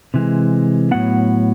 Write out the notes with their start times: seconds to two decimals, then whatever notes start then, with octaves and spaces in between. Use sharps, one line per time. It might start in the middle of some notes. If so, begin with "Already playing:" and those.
0.14 C3 E3 G#3
0.91 A2 F#3 B3 F#5